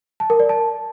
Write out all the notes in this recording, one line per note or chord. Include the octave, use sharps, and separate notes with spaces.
A5
A#4
D5
A5